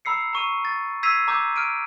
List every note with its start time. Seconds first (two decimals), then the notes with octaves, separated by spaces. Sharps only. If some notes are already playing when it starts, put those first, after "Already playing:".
0.05 A#5 B5 E6 C7 C#7
0.33 A#5 C#6 D#7
0.65 A6
1.03 E6 G#6 B6 C7 D#7 F7
1.28 A#5 D6 E6 G6
1.56 F6 D7 D#7